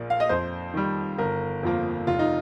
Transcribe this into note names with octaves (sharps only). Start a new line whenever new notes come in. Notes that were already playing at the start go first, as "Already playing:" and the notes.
Already playing: A#1 A#2 A#3
F5
D#5
F2 C5
D#3 G3
G1 A#4
F2 F3 A#3
F1 F4
D#4